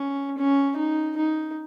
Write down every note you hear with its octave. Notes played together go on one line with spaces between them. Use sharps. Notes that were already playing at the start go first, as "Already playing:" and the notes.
Already playing: C#4
C#4
D#4
D#4